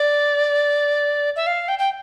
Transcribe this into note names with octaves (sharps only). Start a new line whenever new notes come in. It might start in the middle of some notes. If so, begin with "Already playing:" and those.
Already playing: D5
E5
F5
G5
G5